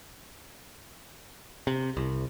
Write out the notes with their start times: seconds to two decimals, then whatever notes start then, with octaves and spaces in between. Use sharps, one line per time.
1.67 C3
1.97 C2